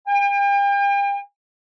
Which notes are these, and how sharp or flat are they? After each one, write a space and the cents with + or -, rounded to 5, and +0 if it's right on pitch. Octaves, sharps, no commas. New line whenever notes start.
G5 +40